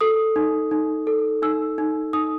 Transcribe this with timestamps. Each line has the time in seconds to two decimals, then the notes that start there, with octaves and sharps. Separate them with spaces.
0.01 A4 D#6
0.36 D#4
0.71 D#4
1.07 A4
1.42 D#4 E6
1.78 D#4
2.13 D#4 D#6